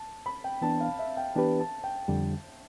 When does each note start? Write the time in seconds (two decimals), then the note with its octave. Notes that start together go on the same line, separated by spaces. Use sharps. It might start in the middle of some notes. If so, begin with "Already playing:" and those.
Already playing: A5
0.26 B5
0.44 G5
0.62 E3 B3 D4 A5
0.81 F5
0.99 E5
1.17 G5
1.35 E3 B3 D4 G4 B4 A5
1.59 A5
1.84 G5
2.08 F2 D3 G3